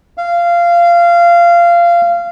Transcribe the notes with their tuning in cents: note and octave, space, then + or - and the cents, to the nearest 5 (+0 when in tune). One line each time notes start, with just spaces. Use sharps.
F5 -20